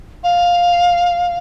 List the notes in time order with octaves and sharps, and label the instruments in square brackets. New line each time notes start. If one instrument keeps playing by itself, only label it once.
[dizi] F5